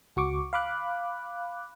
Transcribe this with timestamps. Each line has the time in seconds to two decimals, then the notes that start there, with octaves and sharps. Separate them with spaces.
0.16 C#2 F#4 C#6 D6
0.53 F5 B5 D6 F#6